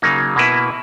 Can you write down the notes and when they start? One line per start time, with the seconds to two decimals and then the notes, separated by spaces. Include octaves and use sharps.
0.02 C#3 F#3 A#3 D#4
0.36 B2 A#3 E4 B4